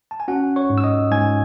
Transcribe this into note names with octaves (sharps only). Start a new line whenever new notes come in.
A5
G#5
C#4 F#4 F#5
C#5 C#6
G#2
E6
D#5 D#6
G#2 G#5 G#6